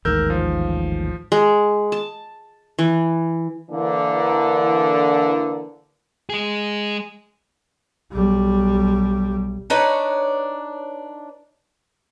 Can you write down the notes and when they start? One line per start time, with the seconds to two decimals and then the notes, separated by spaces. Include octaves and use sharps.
0.05 A1 D#2 G#2 A#4 E6 G6
0.30 F3
1.32 G#3
1.92 A5
2.79 E3
3.70 D3 E3 A#3
6.30 G#3 G#4
8.12 B1 G3
9.70 D4 D#4 B4 C#5